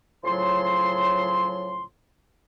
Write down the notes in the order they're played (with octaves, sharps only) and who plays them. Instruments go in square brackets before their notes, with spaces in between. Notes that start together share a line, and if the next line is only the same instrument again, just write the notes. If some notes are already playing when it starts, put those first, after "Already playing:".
[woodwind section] A2 C#3 F3 F#3 C6